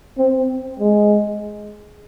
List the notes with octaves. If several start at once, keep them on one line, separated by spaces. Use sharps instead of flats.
C4
G#3